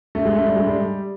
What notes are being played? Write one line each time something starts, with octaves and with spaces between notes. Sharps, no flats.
A3
G#3
A3
G3
G#3
G3